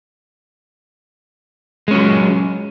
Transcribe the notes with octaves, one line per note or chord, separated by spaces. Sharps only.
F#3 G#3 C#4